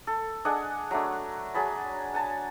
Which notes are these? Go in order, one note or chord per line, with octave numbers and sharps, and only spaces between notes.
A4
D4 G#4 D#5 F#5
F#3 A3 D4
F#3 G#4 A5 B5
F#5 G#5 A5